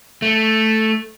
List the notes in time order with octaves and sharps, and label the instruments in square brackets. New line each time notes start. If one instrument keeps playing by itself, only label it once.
[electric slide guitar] A3